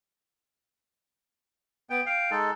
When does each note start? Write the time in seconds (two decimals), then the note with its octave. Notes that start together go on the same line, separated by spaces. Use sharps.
1.90 B3 G5
2.06 F5 G5
2.31 G#3 D#4 A4